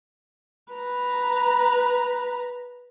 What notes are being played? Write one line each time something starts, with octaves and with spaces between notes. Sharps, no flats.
B4 A#5